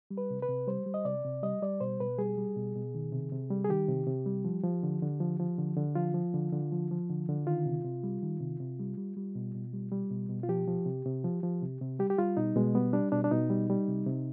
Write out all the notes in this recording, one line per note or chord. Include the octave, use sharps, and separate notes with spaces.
G3
B4
C3
B4
C3
G3 C5
G3
D#5
C3 D5
C3
G3 D#5
G3 D5
B2 C5
B2 B4
G3 G#4
G3
B2
B2
D#3
C3
C3
G3
G#4
D#3 G4
C3
C3
G3
F3
F3
D3
D3
F3
F3
D3
D3
F3 F4
F3
D3
D3
F3
F3
D3
D3
D#3 F4
C3
C3
G3
D#3
C3
C3
G3
G3
G3
B2
B2
G3
G3
B2
B2
F4
F3 G4
F3
C3
C3
F3
F3
C3
C3
G3 G4
G4
G3 F4
B2 D#4
B2 G#3
G3 B3
G3 D4
B2 D4
D4
B2 D#4
G3
G3
C3
C3